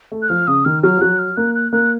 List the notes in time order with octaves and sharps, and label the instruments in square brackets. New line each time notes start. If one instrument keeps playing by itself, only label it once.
[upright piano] A3
[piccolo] F#6
[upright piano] F3 [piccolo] F6
[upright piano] C#3 [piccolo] D#6
[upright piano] D#3 [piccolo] F6
[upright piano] F#3 [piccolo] F6
[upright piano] F3
[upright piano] F#3 [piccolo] F#6
[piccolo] F6
[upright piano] A#3 [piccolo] F#6
[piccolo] F#6
[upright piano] A#3 [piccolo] F#6